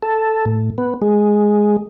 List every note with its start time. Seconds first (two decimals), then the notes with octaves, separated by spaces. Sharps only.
0.03 A4
0.46 A2
0.78 B3
1.02 G#3